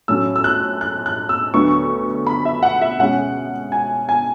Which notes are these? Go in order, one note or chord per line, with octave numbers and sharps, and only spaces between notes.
A2 F#3 C#4 E6
E6
F#6
F#6
F#6
E6
D2 D3 F#3 B3 C#6
B5
E5
F#5
E5
B2 G#3 C#4 F#5
G#5
G#5